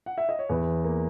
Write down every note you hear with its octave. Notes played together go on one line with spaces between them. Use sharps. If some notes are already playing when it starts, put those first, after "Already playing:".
F#5
E5
D#5
C#5
E2 B4
A#3